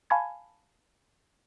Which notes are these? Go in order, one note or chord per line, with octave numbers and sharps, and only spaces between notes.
F5 G#5 A5 B5 C#6 G#6